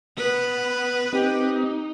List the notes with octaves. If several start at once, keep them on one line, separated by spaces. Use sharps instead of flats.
B3 B4
C4 D#4 G4